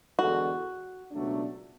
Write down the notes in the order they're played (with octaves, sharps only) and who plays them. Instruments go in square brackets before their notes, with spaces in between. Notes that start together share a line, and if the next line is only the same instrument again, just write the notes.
[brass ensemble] E2 D3 G#3 D4 A4 [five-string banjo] F#4
[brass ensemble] C#2 B2 F#3 A3 D4